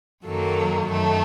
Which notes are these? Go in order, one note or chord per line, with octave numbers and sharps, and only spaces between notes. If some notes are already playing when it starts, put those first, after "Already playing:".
F#2 D#3 F#3 A#3 A4
F#2 D#3 A3 A4